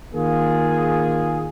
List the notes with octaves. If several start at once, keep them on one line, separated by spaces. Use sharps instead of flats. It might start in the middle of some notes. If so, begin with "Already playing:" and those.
D#3 A#3 F4 G#4